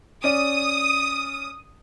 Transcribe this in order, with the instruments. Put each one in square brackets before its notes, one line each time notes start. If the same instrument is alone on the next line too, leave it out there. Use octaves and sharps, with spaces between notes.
[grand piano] C#4 D5 [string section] D#6